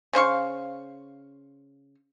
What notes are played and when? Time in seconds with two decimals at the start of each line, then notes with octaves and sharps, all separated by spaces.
0.13 C#3 C5 F5 C#6